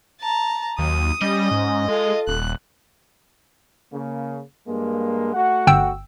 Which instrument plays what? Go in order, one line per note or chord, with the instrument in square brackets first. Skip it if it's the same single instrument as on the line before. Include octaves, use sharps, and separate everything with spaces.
[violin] A5 A#5
[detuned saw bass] D#2 [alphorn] F#3 [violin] D#6
[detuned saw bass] G3 [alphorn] C#4 [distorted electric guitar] D#5
[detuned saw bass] G#2
[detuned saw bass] G#3 [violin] F4 [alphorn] A4
[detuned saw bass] D#1 [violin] F#6
[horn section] C#3 A#3
G2 G#3 A#3
A3 F#4 F#5
[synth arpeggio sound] G1 G5 E6